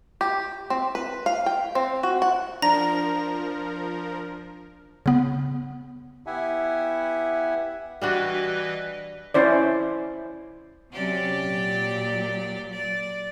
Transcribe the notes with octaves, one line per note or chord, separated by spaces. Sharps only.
G4
C4
B4
F5
G5
C4
F#4
F#5
F3 D4 A#4 A#5 A#6
C#3 B3
B3 E4 G4 E5 F#5 G#5
E3 G3 D4 F#4 B4 D#5
C#4 E4 C5 D5
C3 F#3 C#4 G4 D5
A#2 F#3
D5